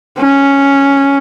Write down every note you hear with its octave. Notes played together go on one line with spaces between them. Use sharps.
C#4